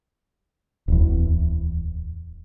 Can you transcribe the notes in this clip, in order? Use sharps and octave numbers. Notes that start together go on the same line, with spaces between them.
D1 E2